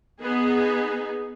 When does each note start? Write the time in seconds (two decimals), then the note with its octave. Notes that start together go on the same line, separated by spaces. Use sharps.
0.22 B3 D#4 G#4